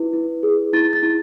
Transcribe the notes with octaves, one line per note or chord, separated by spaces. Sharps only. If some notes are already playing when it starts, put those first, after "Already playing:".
Already playing: E4 B4
E4
G#4
E4 A6
A6
E4